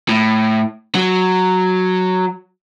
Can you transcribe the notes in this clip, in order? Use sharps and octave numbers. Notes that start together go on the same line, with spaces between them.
A2
F#3